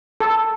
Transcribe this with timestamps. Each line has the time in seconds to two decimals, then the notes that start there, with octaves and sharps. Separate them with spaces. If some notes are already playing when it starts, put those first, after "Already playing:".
0.20 A4